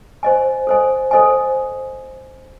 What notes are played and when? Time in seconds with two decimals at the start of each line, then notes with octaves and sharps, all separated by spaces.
0.23 C5 D#5 G#5
0.67 A4 C5 D#5 G#5
1.11 A4 C5 D#5 G#5